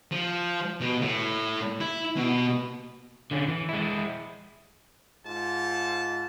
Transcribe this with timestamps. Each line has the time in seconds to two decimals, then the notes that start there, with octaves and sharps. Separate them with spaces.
0.12 F3
0.81 B2
1.02 A2
1.81 E4
2.16 B2
3.31 D3 C#4
3.48 E3
3.69 G#3 E4
5.26 G#2 F4 A5